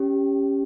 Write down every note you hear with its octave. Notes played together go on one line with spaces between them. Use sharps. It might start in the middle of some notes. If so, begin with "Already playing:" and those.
Already playing: C#4 G4